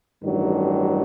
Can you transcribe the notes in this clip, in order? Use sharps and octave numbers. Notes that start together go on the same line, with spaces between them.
A1 G2 D#3 F#3